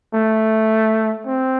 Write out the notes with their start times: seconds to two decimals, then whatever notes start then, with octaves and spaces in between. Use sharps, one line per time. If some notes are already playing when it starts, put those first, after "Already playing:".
0.14 A3
1.26 C4